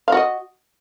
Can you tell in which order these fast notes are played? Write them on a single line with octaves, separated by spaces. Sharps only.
F5 F#4 D#5